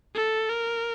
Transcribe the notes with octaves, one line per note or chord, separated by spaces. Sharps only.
A4
A#4